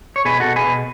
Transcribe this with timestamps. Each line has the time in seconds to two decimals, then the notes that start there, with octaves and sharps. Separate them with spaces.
0.16 C#5
0.25 B2 G#4 B4
0.40 B2 F#4 A4
0.56 G#4 B4
0.66 B2